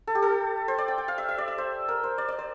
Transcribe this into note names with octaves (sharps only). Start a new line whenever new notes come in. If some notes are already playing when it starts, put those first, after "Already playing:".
A4
G4
A4
C5
D5
G5
G5
F5
E5
E5
D5
E5
C5
A#4
C5
D5
D5
C5